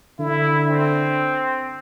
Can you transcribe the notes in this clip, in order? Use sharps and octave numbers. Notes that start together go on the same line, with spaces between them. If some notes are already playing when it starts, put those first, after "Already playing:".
D3 E4
C4